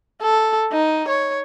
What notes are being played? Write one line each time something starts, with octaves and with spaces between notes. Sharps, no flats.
A4
D#4
C#5